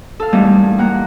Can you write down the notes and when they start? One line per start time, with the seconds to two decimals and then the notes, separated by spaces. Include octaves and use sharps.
0.20 A4 F5
0.33 E2 G#2 G3 A3 A#3 C#4
0.78 A#3 F#5 G5 A#5